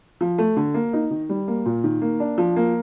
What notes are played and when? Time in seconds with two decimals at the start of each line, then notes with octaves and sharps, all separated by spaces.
0.21 F3
0.38 A3
0.57 D3
0.74 A#3
0.93 D#4
1.11 D#3
1.29 G3
1.48 A#3
1.66 A#2
1.84 D#3
2.02 A#3
2.20 D4
2.38 F3
2.56 A#3